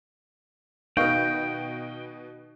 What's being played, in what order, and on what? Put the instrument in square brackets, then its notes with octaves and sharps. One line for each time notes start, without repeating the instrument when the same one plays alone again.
[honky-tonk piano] B2 B3 [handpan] D#4 [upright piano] D#5 F5 C#6 [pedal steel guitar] G5